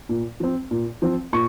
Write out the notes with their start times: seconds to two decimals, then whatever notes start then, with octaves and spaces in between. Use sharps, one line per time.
0.09 A#2
0.40 F3 C4
0.71 A#2
1.02 F3 C4
1.33 A#2 C#6